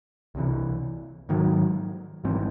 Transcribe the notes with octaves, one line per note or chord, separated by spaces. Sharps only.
C2 C3 E3
G#2 D#3 F#3
G#1 G#2 E3 C4